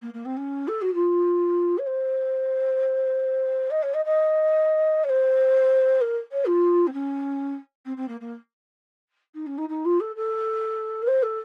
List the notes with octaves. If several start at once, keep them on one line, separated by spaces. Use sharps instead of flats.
A#3
A#3
C4
C#4
A4
F#4
F4
C#5
C5
D#5
C#5
D#5
D#5
C#5
C5
A#4
C#5
F4
C4
C#4
C4
C4
A#3
A#3
D#4
C#4
D#4
D#4
F4
A4
A4
A#4
C5
A4